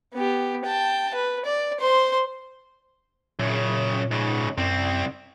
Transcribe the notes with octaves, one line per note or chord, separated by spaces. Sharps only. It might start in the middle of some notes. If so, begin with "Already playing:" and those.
B3 G4
G5 A5
B4
D5
C5 C6
F#2 A#2 C#3
G#2 C#3
C2 F#2 C4